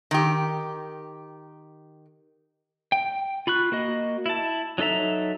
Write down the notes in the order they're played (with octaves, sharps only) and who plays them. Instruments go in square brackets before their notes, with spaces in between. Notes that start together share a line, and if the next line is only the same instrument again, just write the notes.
[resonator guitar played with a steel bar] D#3 G4
[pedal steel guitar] G5
F4 B5 C#6 F#6
A#3 F#4 D#5
E4 A5
F#3 D#4 A4 E5 A#5